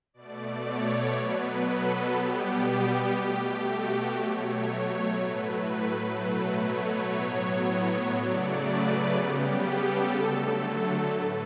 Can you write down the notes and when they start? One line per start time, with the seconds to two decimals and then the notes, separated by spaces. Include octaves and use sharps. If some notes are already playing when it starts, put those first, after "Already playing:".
0.14 B2 A3 D5
0.64 C#5
1.14 B2 F#3 B3 B4
1.64 A4
2.14 B2 G3 B3 G4
3.14 B2 A3
3.64 F#4
4.14 B2 F#3 A3 C#5
4.64 C#5
5.14 A2 F#3 A3 B4
6.15 B2 F#3 A3
6.64 C#5
7.14 A2 F#3 B3
8.14 C#3 F#3 A3 D5
8.64 B4
9.14 C#3 G3 B3 G4
9.64 A4
10.14 D3 F#3 A3
11.14 A2 B4